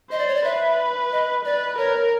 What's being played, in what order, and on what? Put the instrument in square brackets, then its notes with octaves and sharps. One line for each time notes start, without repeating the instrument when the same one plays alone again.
[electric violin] C5 [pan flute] D#5
[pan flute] D5
C#5
D5
[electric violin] B4 [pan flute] E5
[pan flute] D#5
[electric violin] B4 [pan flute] D5
[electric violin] A#4 [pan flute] C#5